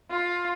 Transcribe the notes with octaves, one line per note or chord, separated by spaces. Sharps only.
F4